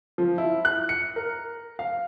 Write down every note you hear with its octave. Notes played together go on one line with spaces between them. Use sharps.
F3
E4
F#6
C#7
A#4
F5